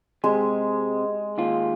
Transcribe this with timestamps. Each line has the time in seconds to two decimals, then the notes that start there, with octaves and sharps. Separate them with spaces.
0.24 C3 G#3
1.38 D#2 F4